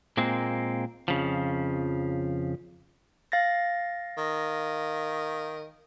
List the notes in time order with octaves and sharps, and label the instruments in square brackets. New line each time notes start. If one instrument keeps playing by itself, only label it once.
[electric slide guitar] A#2 G#3 A#3 C4
F2 C#3 F3
[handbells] F5 A6 A#6
[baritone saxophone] D#3